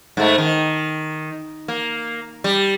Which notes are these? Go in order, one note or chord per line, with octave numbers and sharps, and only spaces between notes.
G#2 A3
D#3
A#3
G3